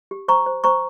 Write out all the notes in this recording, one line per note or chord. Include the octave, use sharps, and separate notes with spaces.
G4
C5 A#5 C#6
C5
C5 A#5 C#6